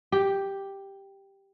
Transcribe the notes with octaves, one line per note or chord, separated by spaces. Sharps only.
G4